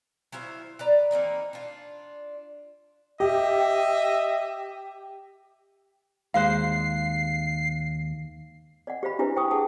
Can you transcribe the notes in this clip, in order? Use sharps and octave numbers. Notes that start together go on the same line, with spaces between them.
F#3 E4 F4 C5
B4 D5 A#5
E3 A#3 C4 D#4
D4 F4
G4 D#5 E5
D#2 G#3 C5 F5 F#6 C7
D5 D#5 F#5
G4 C5 F5 B5
D4 E4 G4 B4 C5 E5
C5 G5 C#6 D#6
G4 G#4 F#5 A5 D#6